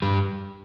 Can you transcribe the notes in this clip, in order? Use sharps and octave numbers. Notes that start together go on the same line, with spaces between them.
G2 G3